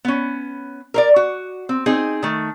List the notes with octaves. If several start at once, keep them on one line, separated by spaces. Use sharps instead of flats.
B3 C#4
A#4 C5 D5
F#4
C4
C4 D#4 G#4
D#3 A3